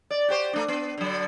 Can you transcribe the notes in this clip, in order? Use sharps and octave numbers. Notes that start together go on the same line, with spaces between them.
D5
F#4 G4 C5
A3 D4
B3
D3 F#3